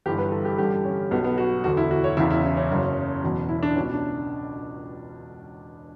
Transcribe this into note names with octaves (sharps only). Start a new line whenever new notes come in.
G1 G2 E3 G4
B4
A4
G4
A1 G2 D3 G4
C#4
B1 B2 B3
B3
F#4
E1 D2 D3 F#4
E4
F#4
C#5
E1 E2 C#3 E3 E4
E4
C#4
C#4
F#1 F#2 C#3
E1 E2 B2
E4
D4
C#2 B2 C#4
D4